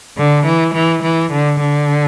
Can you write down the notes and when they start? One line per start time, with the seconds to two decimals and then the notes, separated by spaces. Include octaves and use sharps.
0.18 D3
0.46 E3
0.74 E3
1.03 E3
1.32 D3
1.60 D3